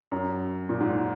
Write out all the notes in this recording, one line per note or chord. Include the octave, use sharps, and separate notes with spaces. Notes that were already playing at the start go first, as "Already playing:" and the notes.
F#2
A#2
G#2